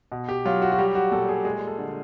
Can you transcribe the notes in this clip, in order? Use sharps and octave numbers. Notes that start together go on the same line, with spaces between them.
B2
G4
F#3 F4
F#4
F#4
G3 G4
F#4
A#2 A4
G#4
G#3 G#4
A4
D3